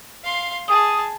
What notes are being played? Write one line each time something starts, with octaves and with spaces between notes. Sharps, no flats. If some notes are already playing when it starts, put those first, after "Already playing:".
F5 C6
G#4 A5 D#6